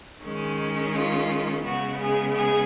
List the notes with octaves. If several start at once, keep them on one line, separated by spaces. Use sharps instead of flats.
D#3 G#3 C#4
F4
C#3 G#3 B3 F#4
G#4
G#4